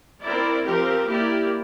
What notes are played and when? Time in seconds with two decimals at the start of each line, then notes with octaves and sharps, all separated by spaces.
0.24 C4 E4 A#4 D5
0.64 F3 C4 G4 A#4
1.06 A#3 E4 G4 A#4 D5